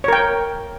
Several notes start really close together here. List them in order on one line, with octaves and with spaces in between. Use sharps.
C#5 A#4 G5